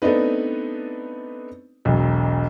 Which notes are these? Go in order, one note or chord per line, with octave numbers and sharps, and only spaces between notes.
A3 B3 C4 D4 D#4 B4
E1 B1